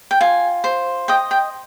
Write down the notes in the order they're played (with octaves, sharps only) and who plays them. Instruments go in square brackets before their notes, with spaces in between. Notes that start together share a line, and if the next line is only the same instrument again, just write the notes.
[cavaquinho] G5
F4 G#5
C5
D#5 G5
G5